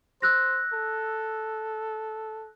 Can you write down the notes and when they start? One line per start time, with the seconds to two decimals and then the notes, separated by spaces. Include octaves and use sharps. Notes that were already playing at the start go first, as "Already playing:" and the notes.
0.22 C5 E6 F#6 A#6
0.73 A4